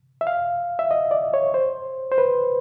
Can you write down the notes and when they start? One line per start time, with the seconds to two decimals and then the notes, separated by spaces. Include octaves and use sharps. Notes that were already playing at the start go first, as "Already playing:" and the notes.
0.21 E5
0.27 F5
0.79 E5
0.91 D#5
1.11 D5
1.34 C#5
1.54 C5
2.12 C5
2.18 B4